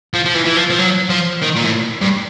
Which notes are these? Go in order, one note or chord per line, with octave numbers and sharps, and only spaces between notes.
F3
F3
E3
E3
F3
F3
F#3
F3
D#3
A#2
A2
G2